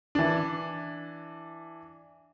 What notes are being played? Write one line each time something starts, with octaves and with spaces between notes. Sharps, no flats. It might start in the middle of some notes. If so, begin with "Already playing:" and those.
E3 D4